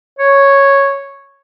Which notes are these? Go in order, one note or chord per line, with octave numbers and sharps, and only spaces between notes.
C#5